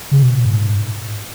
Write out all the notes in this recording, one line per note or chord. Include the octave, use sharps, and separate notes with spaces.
C#3
B2
A#2
G#2